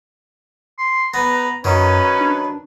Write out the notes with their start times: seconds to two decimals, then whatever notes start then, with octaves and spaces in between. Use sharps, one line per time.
0.78 C6
1.14 B3 B4 A#5
1.64 F#2 D#3 F#3 C#4 B4
2.21 D4